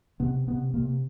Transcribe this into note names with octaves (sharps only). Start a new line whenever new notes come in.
C3 B3
C3 B3
C3 A#3